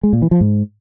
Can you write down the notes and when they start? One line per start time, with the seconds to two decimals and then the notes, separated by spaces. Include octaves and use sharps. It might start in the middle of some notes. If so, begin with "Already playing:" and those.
0.03 G#3
0.13 A#2
0.22 E3
0.31 F3
0.41 G#2